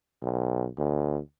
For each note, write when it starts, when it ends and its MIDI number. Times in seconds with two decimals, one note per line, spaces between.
0.22 0.68 35
0.77 1.19 38